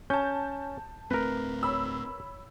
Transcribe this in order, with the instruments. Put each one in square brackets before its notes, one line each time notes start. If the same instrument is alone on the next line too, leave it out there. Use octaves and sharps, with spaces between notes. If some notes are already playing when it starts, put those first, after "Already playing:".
[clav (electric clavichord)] C#4 [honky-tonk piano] A5 G6
[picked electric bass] D1 A3 C4 [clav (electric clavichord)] A#4 B4
[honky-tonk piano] C#5 B5 E6